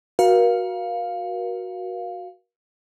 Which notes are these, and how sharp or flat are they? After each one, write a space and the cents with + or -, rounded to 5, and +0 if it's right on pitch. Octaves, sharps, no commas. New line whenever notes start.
F#4 +0 A#4 +35 F5 +0